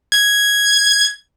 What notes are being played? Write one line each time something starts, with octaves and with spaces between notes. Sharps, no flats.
G#6